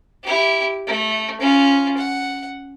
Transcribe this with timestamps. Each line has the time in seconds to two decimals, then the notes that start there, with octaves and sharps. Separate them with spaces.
0.23 E4 G4
0.87 A3
1.41 C#4 F4
1.98 F#5